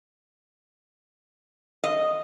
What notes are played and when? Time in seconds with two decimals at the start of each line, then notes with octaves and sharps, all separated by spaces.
1.84 D#5